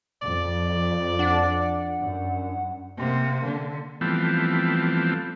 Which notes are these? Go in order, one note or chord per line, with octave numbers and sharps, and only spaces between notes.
F2 D5
D4 F#5
F#2
C3 A#3
D3
E3 F3 G3 A3 B3 C4